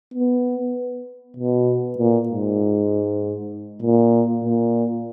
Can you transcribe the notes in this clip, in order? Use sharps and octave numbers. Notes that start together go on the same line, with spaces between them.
B3
B2
A#2
G#2
A#2
A#2